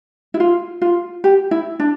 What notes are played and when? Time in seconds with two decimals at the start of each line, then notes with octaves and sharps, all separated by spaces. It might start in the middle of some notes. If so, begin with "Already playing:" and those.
0.34 E4
0.40 F4
0.82 F4
1.24 G4
1.51 E4
1.80 D4